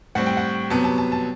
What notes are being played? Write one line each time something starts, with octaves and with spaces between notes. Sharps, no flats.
A2 G3 C4 F#5
G5
F#5
C3 F#3 B3 A5
A5
A5
A5